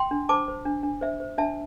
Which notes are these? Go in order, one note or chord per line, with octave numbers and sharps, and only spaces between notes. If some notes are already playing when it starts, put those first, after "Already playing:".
Already playing: G5 C6
D4
C5 A5 D6
C5
D4
D4
C5 E5
C5
D4 E5 A5